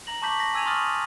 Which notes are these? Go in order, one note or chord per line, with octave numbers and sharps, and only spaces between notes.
A#5 A#6 F#7
A5 C#6 D6 G6 B6 F#7
A#6 B6
G#5 E6 G#6 D#7 F7
C6 C#6 D#6 F6 A6 F#7